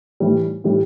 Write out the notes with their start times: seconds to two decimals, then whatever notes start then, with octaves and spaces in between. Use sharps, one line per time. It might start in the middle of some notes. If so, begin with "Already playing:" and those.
0.20 A2 E3 G3
0.64 A2 E3 G3